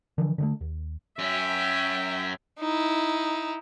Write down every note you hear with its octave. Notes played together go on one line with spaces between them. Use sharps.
D3 E3 F3
D3 F3 A3
D#2
F#2 C#4 E5 G5
D#4 E4